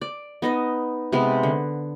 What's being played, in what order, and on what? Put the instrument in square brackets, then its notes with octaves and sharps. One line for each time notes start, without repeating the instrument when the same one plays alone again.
[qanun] D5
B3 D#4 D#5
C3 G#3 B3
D3